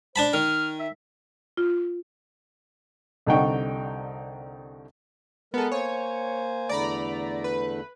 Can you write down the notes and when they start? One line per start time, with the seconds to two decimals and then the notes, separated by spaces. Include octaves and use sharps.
0.16 D4 C5 A5 B5
0.34 D#3 F6
0.80 E5
1.57 F4
3.26 C2 D3 D#4 F#5 G5 C#6
5.54 G#3 B3 A4 A#4
5.72 A#3 C5 C#5 G#5
6.69 E2 D3 A3 D5 A#5 B5
7.44 B4